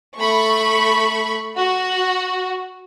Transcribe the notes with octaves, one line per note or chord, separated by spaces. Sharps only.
A3 B5 C#6
F#4